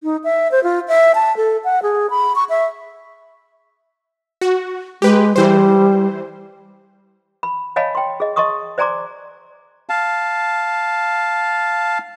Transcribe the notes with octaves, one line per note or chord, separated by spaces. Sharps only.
D#4
E5
C5
F4
E5
A5
A4
F#5
G#4
B5
C#6
E5
F#4
G#3 G4 B4
E3 G3 C5
B5
C#5 D#5 F5 G#5 A5 B5
G5 C6
G#4 D#5
D#5 A5 C6 C#6 D#6
C5 D5 G#5 A#5 C6 D6
F5 A5